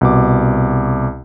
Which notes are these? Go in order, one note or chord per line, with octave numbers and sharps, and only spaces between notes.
C2 B2 D6